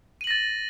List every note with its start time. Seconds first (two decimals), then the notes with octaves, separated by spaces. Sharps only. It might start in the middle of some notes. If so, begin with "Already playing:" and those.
0.21 D#7
0.24 F#7
0.27 A#6
0.31 A6